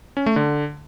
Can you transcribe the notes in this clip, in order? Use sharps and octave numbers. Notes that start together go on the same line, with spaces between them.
C#4
A3
D3